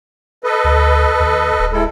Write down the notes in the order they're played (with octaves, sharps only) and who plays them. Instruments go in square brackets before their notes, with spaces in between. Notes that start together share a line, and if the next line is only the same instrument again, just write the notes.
[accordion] A4 B4 D#5
[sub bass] D2
D#2
D1
[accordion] G#3 E4 A4